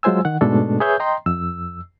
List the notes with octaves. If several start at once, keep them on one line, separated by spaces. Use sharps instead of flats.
F#3 G#3 F4 C5 G#5 E6
D#3 F#5
G#2 B2 G#3 A3 D4 A4
G#4 B4 C#5 E5 G6
D#5 G5 A#5 C6
F2 E6